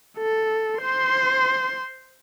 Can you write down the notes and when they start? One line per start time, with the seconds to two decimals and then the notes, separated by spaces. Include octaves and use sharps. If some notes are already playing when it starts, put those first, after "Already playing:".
0.18 A4
0.81 C5 C6